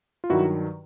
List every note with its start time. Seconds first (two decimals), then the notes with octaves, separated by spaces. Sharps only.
0.24 F4
0.30 G2 D#3 F#3 E4 F#4